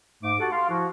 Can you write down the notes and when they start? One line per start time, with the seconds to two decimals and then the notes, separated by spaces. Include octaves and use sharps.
0.23 G#2 A3 D6
0.39 F#4 G4 A4 F#5 A5
0.52 F5 C6
0.69 F3 E4 F#4